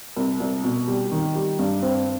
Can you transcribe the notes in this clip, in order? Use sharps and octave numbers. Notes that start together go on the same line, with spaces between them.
C2
C2
B2
G3
D#3
G3
G2
C4